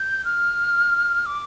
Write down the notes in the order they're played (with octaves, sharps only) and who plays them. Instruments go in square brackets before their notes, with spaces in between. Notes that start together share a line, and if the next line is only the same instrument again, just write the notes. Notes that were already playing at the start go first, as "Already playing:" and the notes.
Already playing: [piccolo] G6
F6
D6